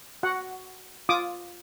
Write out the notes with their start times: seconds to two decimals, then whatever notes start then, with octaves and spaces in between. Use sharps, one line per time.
0.23 F#4 F#5
1.09 F4 D6 D#6